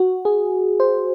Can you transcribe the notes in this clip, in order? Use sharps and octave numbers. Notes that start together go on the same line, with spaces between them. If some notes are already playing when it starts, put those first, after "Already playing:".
Already playing: F#4
G#4
C5